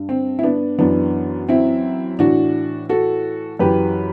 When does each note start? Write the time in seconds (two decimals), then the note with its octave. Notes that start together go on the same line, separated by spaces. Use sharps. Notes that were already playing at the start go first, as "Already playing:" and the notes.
Already playing: G2
0.09 C4
0.39 E4
0.43 B3 D4
0.78 F#2 E3 B3 D4
1.49 C4 E4
2.19 A2 E3 D4 F#4
2.89 F#4 A4
3.59 F#2 E3 G4 B4